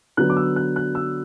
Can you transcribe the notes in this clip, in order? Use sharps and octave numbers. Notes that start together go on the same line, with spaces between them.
D3 F#3 B3 F#6
D6
E6
F#6
F#6
E6